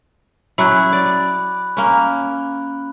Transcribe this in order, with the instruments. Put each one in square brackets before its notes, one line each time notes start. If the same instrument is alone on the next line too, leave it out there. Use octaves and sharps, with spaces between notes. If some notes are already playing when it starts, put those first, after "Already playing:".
[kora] F#3 C#4 E4 [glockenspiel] B5 F#6
[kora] D5
A#3 C#4